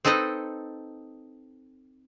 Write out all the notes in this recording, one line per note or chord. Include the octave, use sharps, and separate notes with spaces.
C4 D#4 A4 B4 D#5